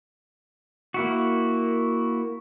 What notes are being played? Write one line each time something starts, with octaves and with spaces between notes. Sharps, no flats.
A#3 E4 F#4